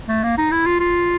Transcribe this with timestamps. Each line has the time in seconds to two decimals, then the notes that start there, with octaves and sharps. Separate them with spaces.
0.08 A3
0.23 A#3
0.38 D#4
0.51 E4
0.66 F4
0.80 F4